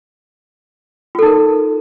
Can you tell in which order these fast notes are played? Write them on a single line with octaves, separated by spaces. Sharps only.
F4 A4 D#4 A#4